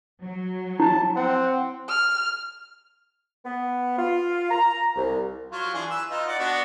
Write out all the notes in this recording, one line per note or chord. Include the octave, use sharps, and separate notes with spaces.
F#3
E4 A5
C4 F#5
F6
B3
F4
A#5
C2
F#3 F4
E3 D4 G#4
B4 E6
D#4 F4
D5 F#5
B3 D4 F#4